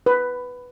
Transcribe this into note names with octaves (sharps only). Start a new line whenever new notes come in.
B4